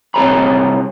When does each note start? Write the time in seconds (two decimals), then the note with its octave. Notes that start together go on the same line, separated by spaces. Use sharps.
0.14 C2 C4 G#4 C#5 A#5 B5